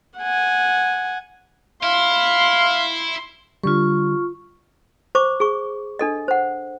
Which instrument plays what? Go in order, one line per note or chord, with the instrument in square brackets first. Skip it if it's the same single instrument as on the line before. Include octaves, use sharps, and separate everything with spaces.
[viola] F#5 G#5
[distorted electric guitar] E4 [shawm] F5 [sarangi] C6
[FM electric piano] D3 G3 [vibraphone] F4 C#6
[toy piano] C5 C#6 D6
G#4 C#6
D4 A4 D#5
C5 F#5